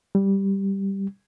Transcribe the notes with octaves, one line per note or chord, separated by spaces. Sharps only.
G3